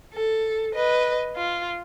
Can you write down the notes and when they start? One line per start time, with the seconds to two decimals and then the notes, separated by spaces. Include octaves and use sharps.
0.14 A4
0.75 B4 D#5
1.36 F4